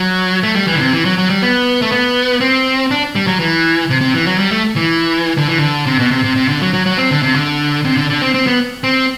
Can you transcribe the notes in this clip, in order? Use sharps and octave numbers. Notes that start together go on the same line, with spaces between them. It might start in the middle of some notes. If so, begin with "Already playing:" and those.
Already playing: F#3
A3
G3
E3
D3
C3
E3
F#3
F#3
G3
B3
A3
B3
C4
D4
G3
F#3
E3
C3
C3
E3
F#3
G3
A3
E3
D3
E3
D3
C3
B2
C3
C3
C3
D3
F#3
F#3
F#3
C4
D3
C3
D3
C3
D3
D3
C4
C4
B3
C4